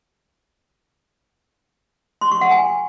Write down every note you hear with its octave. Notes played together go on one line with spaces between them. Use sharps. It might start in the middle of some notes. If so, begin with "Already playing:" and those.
C6
C#6
F#5
G#5